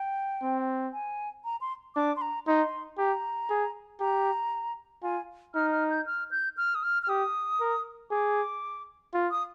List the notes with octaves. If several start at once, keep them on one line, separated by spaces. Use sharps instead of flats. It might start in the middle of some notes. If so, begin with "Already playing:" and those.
Already playing: G5
C4
G#5
A#5
C6
D4 D6
C6
A#5
D#4 C6
G4 A#5
G#4
G4 A#5
F4 G#5
D#4 F6
F6
G6
F6
G6
F6
D#6
F6
F6
G4 D#6
A#4
G#4 D6
F4
D#6